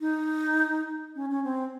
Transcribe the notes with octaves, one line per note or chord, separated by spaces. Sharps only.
D#4
C#4
C#4
C4